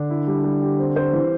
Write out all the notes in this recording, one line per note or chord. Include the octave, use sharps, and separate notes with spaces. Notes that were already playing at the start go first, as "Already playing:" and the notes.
Already playing: D3 D4
E4
G3
G3
G4
C4
C5
E3